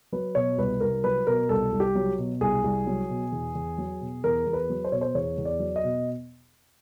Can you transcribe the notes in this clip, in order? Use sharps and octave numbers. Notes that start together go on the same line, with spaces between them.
F#3 B4
B2 C#5
C2 B4
C2 A#4
F#3 B4
B2 A#4
C2 A4
C2
G4
F#3
B2
C2 G#4
C2
F#3
B2
E2
E2
F#3
B2
E2 A#4
E2
B4
F#3
C5
B2 C#5
C5
E2 C#5
E2
D5
F#3
D#5
B2